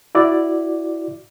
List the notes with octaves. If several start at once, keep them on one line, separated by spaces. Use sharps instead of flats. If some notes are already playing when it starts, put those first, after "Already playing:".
E4 F#4 D5